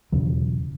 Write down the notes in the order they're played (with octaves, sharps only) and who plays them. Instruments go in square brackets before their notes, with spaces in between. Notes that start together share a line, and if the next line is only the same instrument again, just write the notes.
[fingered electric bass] E1 E2 C#3 F#3